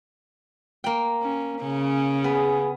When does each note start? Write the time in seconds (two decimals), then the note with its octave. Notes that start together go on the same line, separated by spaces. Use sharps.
0.84 A#3 G5
1.22 C#4
1.61 C#3 C#4
2.24 B3 G#4